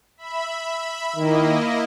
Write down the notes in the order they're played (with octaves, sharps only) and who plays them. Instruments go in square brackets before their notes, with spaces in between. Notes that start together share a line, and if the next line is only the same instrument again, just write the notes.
[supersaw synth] E5 B5
[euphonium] D#3 [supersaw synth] A#3 E4 D#5